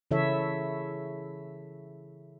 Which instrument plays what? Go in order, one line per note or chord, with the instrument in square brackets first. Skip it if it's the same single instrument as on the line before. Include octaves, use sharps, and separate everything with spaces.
[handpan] C#3 E3 E4 A4 C#5 E5